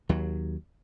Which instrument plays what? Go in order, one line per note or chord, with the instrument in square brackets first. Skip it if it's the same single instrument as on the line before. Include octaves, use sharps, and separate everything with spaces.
[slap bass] D#2 F#3